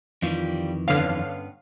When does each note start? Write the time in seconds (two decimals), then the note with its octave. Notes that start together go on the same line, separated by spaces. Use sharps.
0.22 F2 D#3 E3 G3 F4
0.88 G2 D3 B3 C#4 F5